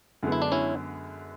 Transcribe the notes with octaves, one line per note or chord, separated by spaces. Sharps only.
F#2 D3 G#3 B3
E4
D4
C#4 E4